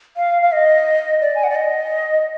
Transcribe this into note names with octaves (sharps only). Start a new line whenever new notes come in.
F5
F5
D#5
D5
G#5
F#5
D5
D#5